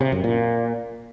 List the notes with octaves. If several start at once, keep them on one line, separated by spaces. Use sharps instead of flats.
C3
F#2
A#2